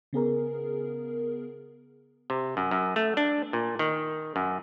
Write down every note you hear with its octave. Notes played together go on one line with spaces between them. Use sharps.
C#3 B3 G#4 A#4
C3
F#2
F#2
A3
D4
A#2
D#3
F#2